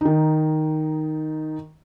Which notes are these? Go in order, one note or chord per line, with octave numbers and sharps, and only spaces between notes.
D#3 D#4